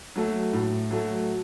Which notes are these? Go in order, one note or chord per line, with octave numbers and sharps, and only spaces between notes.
F#3 A3
A2
F#3 A3